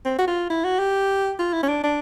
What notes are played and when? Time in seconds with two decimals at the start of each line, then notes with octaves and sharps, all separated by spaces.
0.05 C4
0.18 F#4
0.28 F4
0.50 E4
0.64 F#4
0.79 G4
1.39 F4
1.53 E4
1.63 C#4
1.68 D4
1.84 D4